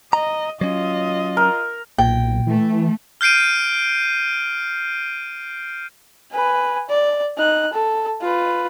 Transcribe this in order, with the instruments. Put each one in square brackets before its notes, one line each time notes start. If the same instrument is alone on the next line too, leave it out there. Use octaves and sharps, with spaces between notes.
[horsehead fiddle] D#5 [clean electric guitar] A#5
[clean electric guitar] F#3 C#4 [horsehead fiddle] F4 D#5
[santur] A#4
[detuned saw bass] B1 [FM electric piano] A#2 [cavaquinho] G5
[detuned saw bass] E3 [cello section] A3
[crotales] F6 G6 C7 D7 D#7
[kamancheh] B4 G#5
D5
D#4 F#6
A4
F4 B4